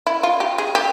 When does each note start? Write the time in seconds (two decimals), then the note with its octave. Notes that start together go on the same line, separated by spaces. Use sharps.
0.07 E4
0.23 F4
0.40 G4
0.58 G#4
0.75 G4